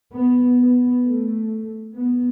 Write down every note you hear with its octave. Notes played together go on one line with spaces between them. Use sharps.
B3
B3
A3
B3